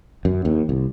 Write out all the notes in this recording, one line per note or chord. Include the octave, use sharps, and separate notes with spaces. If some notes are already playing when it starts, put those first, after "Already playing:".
F#2
D#2
C2